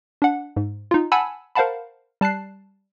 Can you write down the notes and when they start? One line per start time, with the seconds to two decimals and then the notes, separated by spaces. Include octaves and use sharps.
0.22 D4 F#5
0.57 G#2
0.91 D#4 F4
1.12 F#5 G#5 A5 B5 E6
1.55 A#4 C5 F5 F#5 A5 B5
2.21 G3 A5 F#6 C7